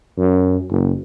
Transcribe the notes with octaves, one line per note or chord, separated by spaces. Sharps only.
F#2
F#1